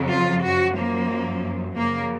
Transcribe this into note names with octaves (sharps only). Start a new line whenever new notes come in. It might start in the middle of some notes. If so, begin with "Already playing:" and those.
Already playing: F2 C#3 F#3
F4
F#2 F3 F#4
A#3
F#2 C#3 F3 A#3